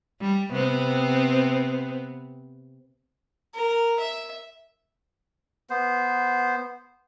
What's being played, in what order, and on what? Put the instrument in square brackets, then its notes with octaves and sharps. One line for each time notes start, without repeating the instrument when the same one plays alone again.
[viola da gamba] G3
C3 B3 C4
[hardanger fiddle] A#4
E5
[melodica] B3 C5